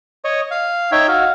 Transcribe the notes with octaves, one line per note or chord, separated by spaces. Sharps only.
C#5 D#5
F5
D#4 C#5 E5 G5
F#4 F5